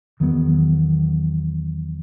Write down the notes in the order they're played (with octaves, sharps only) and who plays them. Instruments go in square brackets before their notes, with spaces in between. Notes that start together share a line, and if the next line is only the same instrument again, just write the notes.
[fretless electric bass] E2 D#3 F#3 B3